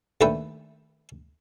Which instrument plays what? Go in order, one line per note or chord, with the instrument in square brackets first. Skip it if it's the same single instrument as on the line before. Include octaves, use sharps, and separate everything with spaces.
[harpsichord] D#2 D3 A3 B4 E5 G5